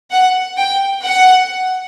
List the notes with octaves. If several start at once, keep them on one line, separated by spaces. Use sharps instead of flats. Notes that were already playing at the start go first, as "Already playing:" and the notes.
F#5
G5
F#5